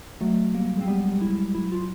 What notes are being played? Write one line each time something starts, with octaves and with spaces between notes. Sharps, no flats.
F#3 A3
G3 A#3
G#3 C4
G3 B3
G3
G#3 E4
F#3 E4
F4